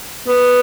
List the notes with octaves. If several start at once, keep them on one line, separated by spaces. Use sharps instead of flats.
B3